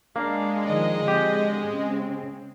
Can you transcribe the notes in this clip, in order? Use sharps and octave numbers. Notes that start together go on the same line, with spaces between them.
G#3 A#3 D4 F5
D#3 F3 D#4 D#5
D3 C4 G4
C#3 C4